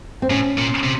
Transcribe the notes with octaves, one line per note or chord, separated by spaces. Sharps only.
C4
A2 C#4
A#2
C3